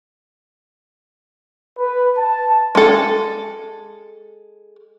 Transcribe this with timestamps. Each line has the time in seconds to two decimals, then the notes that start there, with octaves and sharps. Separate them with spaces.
1.79 B4
2.18 A5
2.75 G#3 A4